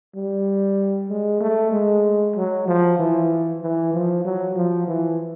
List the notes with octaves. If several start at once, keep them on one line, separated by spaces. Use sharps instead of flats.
G3
G#3
A3
G#3
F#3
F3
E3
E3
F3
F#3
F3
E3